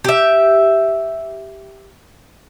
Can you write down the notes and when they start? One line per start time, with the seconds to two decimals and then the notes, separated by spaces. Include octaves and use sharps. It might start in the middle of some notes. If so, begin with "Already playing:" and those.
0.04 G4 E5